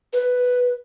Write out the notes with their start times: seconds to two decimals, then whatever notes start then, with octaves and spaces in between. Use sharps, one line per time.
0.13 B4